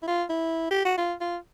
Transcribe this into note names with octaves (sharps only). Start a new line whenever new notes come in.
E4
F4
E4
G4
F#4
F4
F4